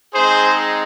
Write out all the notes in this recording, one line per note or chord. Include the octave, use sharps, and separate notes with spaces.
G#3 C4 D#4 G#4 C5